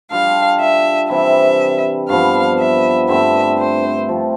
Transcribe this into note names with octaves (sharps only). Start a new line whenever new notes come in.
G3 D4 F4 A4 F5
E5
C3 E3 G3 E5
G2 F3 B3 F5
E5
G2 D3 A3 C4 E5
C5
F3 A3 C4 F4